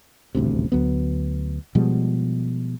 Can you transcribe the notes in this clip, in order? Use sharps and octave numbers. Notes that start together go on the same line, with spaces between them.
D#1 A1 D2 C3
D2 F#3 B3
B2 F3 G3 G#3